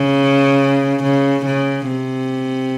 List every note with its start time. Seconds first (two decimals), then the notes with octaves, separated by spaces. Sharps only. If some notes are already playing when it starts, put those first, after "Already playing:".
Already playing: C#3
1.03 C#3
1.46 C#3
1.88 C3